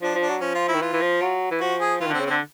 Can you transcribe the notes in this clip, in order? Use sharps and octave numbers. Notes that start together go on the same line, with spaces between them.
F3 D4
F3
D4
F#3
F3 C#4
F4
E4
D#3
E3 F4
E3
F3
F#3
E3
F3 F#4
G#4
E3 F4
D#3
D3 C4
C#3
D3 C4